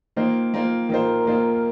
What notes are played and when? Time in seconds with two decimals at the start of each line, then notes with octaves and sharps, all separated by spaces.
0.16 D#3 A#3 F4 C5
0.53 D#3 A#3 F4 C5
0.89 D#3 A#3 F4 A#4 C5
1.26 D#3 A#3 F4 C5